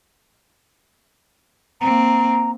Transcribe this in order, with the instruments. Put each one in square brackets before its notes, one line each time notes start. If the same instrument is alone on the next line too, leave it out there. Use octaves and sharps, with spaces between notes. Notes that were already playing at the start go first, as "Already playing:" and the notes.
[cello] A#3 C4 [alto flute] A#5